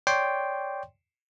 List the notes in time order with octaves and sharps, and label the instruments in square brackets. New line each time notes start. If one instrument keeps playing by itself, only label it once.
[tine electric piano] C#5 D5 G5 C6